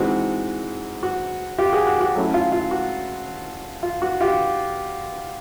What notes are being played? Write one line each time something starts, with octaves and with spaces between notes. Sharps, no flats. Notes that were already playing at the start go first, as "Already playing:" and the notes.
Already playing: E3 G#3 C4 D#4 F#4
F#4
F4 G4
F#4 G#4
F#4
F#4
F#3 A3 C#4 E4
F4
F4
F#4
F4
F#4
F4 G4